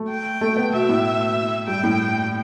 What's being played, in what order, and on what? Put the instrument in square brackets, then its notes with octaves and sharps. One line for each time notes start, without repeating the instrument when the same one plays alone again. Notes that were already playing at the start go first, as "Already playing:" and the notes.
Already playing: [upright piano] A3
[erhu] G5
[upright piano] A3
B3
[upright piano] B2 [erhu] E5
[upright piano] A2
[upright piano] G2 [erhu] G5
[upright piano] A2